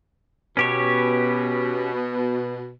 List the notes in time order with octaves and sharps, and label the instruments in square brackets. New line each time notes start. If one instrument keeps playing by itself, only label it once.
[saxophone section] B2 [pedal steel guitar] C#4 G4 C#5